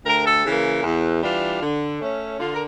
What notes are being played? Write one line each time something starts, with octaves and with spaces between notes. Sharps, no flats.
D2 A#4
A4
C#3 E3 A#3
E2
E3 G3 D4 F4
D3
A3 C#4
D3 F4
A#4